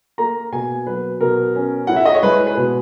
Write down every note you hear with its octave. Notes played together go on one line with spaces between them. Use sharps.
A#3 A#5
B2 G#5
F#3 B4
B2 A#4
C#4
E4 F#5
E5
D#5
C#5
G#3 B4
B4
B2